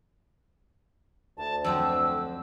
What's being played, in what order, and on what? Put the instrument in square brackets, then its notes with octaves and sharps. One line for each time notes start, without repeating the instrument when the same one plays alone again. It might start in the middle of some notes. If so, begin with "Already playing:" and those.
[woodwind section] D2 [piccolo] A5
[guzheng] F2 F#3 C5 [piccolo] E6